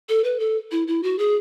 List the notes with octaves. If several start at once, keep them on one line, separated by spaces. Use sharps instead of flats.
A4
B4
A4
E4
E4
F#4
G#4